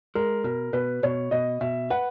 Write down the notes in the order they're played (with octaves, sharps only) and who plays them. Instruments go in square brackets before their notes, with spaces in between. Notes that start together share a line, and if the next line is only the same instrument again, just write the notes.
[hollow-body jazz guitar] G#3 [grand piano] A#4
[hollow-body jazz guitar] B2 [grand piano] A#4
[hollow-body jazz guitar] B2 [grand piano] B4
[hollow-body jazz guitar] B2 [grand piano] C#5
[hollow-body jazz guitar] B2 [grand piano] D#5
[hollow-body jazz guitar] B2 [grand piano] E5
[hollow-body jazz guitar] B4 [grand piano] F#5